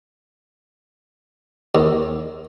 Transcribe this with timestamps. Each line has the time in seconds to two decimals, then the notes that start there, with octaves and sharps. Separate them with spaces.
1.75 D#2